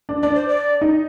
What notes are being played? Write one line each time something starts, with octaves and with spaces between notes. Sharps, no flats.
D4
D4 D5
C5
D5
D#4